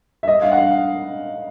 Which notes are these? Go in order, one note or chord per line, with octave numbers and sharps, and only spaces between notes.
E5
D#5
F5
F#5
F5